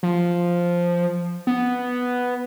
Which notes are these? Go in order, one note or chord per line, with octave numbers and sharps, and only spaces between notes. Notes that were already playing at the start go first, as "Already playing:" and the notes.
F3
B3